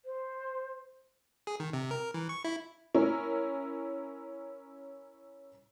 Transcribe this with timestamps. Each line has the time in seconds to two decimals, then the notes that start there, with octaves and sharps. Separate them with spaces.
0.05 C5
1.47 G#4
1.60 D#3
1.73 C3
1.91 A#4
2.14 E3
2.29 C#6
2.44 E4
2.95 C#4 E4 A#4